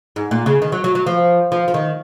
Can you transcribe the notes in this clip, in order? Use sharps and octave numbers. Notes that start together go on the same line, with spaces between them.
G#2
A#2
C#3
D#3
F#3
F#3
F#3
F3
F3
F3
D#3